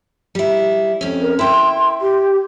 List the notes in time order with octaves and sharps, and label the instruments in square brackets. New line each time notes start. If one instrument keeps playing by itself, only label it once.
[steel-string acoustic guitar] G3 E4
F2 C#4
[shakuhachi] A#4
[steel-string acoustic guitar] E4 G5 [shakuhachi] C6
[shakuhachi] G4